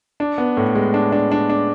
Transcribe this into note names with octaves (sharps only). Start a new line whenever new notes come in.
D4
B3
A2
G#3
D4
D4
D4
D4